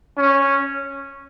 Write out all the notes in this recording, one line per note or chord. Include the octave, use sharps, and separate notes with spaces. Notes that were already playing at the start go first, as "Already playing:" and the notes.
C#4